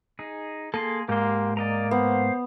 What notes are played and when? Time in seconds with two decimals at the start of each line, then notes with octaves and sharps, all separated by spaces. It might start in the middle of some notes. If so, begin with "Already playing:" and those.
0.19 D#4 G#4
0.74 A#3 G#4 A4 C6
1.09 G#2 A#3 G4 C6
1.57 A#3 D5 D#5 A#5
1.91 B3 C5